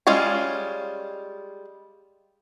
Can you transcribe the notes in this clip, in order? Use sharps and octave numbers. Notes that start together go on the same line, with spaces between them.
G3 G#3 C#4 F4 G#5